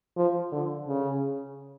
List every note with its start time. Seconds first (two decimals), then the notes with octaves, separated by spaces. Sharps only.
0.16 F3
0.52 D3
0.88 C#3